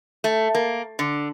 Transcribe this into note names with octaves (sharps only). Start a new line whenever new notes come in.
A3
A#3
D3